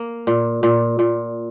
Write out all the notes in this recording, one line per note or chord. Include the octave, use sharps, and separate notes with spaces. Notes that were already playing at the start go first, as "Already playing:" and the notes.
Already playing: A#3
A#2
A#2
A#2